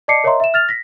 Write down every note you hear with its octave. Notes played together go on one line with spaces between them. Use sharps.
D5 D#5 A5 D6 C7 C#7
A#4 C#5 D#5 E5 A#5 C6
E5 E7
F6 A6 F7
A#6 B6